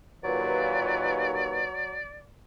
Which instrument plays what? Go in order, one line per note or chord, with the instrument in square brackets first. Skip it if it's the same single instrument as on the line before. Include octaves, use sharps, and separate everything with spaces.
[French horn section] D#2 A#2 B4 [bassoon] F#3 [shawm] D5